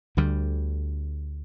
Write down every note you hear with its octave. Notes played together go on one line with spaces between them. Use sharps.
D2 D3 G3